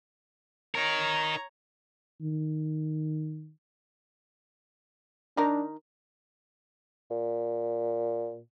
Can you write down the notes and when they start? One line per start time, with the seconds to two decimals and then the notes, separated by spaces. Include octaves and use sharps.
0.75 D#4 A#4 C#5 A#5
2.21 D#3
5.37 D#3 D4 D#4 A#4
7.10 A#2